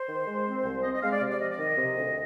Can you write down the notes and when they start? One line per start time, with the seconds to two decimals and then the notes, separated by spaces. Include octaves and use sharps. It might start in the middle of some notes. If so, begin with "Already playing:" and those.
Already playing: C5
0.09 D#3
0.28 G#3
0.46 C4
0.65 C2
0.84 C4 D#5
0.94 D#5
1.03 G#3 F5
1.12 D5
1.22 C3
1.31 D5
1.40 F3 D#5
1.51 D5
1.59 D#3 D#5
1.78 C3
1.98 D2